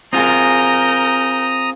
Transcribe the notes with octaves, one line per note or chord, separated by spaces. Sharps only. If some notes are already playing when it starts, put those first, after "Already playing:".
C4 F4 G#4 A#4 A#5 D#6 G6